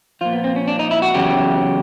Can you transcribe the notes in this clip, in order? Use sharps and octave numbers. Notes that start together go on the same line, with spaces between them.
A#2 F3 F4
B3
C4
C#4
D4
D#4
E4
F#4
E2 C#3 F#3 G4